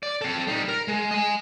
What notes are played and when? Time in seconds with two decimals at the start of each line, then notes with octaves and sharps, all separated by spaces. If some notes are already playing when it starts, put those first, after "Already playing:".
0.03 D5
0.21 C4 A4
0.47 G3 D#4
0.68 A#4
0.88 G#3
1.11 D#5 G#5